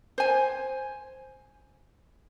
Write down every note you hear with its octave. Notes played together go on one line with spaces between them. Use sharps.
C5 G#5